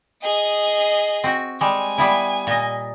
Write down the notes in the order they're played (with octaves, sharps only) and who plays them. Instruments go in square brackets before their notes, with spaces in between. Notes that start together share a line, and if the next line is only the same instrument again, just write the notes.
[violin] G#4 D#5
[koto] C4 F#4
[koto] G3 G#3 [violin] G#5
[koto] G3 B3 E4
A#2 D#5